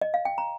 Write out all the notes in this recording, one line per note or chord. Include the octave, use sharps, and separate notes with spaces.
D#5
F5
G5
A#5